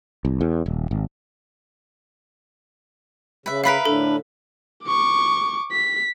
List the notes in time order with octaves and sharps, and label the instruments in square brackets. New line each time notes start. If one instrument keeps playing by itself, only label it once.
[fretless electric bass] C2
E2
D#1
G#1
[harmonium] C#3 [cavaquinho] B4 E5
[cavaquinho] A#4 B4 E5 [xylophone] F5 B5 B6
[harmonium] A2 D3 [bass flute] D4 [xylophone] A4
[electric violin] C#6 D6
B6